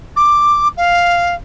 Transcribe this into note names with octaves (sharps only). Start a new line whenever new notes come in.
D6
F5